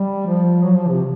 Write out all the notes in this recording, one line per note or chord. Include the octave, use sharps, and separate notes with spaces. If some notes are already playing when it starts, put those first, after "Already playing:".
Already playing: G3
F3
F#3
F3
C3